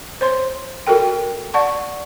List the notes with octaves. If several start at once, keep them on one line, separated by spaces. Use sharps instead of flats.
C5 C#5 C6
F#4 A4 A#4 G5
D5 F#5 A5 C#6